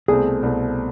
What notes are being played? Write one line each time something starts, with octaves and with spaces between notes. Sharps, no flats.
C2 B2 A3 C4 G#4
C2 B2 A3 C4